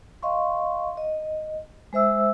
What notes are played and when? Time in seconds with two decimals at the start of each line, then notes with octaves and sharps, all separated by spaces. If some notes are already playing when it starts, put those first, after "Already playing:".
0.23 D#5 F5 C6 C#6
0.97 D#5
1.93 G#3 C5 E5 E6